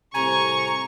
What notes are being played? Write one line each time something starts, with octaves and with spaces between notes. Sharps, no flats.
C2 A2 C3 G#5 A#5 C#6